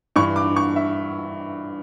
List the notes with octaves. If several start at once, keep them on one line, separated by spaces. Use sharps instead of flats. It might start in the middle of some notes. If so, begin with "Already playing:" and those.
G2 E3 C#6
D6
C#6
E5